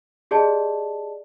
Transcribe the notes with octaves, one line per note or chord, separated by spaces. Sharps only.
G4 G#4 D5 D#5 A5